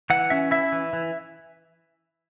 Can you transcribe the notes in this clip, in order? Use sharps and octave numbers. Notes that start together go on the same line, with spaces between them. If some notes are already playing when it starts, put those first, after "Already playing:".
E3 F#5
C#4 E5
E4 E5
E3
E3